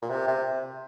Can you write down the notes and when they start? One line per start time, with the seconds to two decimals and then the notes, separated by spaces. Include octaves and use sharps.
0.02 A#2
0.10 C3
0.27 C3